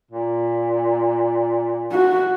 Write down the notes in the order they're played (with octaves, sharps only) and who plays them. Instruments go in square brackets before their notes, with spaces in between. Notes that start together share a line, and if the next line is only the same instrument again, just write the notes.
[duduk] A#2
[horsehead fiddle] F#4